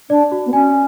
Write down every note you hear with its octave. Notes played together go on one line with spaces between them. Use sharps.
D4 D5
F#4
B3
C#4 G#5